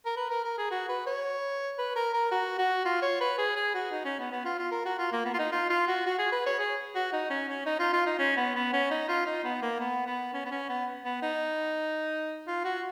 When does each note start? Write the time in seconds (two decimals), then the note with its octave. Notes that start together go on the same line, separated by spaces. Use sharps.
0.06 A#4
0.17 B4
0.30 A#4
0.44 A#4
0.58 G#4
0.71 F#4
0.89 B4
1.06 C#5
1.78 B4
1.96 A#4
2.13 A#4
2.31 F#4
2.58 F#4
2.85 F4
3.02 C#5
3.21 B4
3.38 G#4
3.56 G#4
3.74 F#4
3.92 D#4
4.05 C#4
4.19 B3
4.32 B3
4.45 F4
4.59 F4
4.71 A#4
4.86 F#4
4.99 F4
5.12 A#3
5.25 B3
5.34 F4
5.39 D#4
5.52 F4
5.70 F4
5.88 F#4
6.06 F#4
6.19 G#4
6.32 B4
6.46 C#5
6.59 G#4
6.95 F#4
7.13 D#4
7.30 C#4
7.48 C#4
7.66 D#4
7.79 F4
7.93 F4
8.06 D#4
8.19 C#4
8.37 B3
8.55 B3
8.73 C#4
8.91 D#4
9.09 F4
9.26 D#4
9.44 B3
9.62 A#3
9.80 B3
10.06 B3
10.33 C#4
10.45 B3
10.51 C#4
10.69 B3
11.05 B3
11.22 D#4
12.47 F4
12.64 F#4